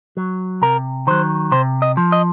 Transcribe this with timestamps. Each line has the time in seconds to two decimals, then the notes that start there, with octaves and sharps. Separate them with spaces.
0.17 F#3
0.62 C3 A#4
1.07 D#3 F#3 C5
1.51 C3 C5
1.82 D#5
1.97 F3
2.12 D#5